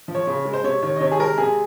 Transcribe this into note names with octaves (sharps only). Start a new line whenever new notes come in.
F3
C#5
C#3
G#3
C5
C3 C#5
D#3 C#5
D#5
C3 C#5
G#4
G#3 A#4
C3 G#4